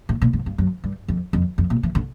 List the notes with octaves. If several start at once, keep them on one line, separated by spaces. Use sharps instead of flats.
A2
A#2
G#2
G2
F#2
G2
F2
F2
F2
A#2
E3
D3